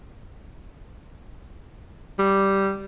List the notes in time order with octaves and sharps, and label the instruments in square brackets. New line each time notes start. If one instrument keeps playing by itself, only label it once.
[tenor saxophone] G3